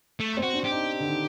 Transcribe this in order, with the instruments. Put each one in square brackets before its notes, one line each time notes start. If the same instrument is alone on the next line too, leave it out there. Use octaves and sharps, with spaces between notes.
[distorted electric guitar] A3
[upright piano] C4
[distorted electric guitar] F#4
[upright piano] D4
[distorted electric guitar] G4
[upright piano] D#4
D3
D#3